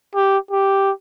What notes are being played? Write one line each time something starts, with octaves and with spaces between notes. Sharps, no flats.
G4
G4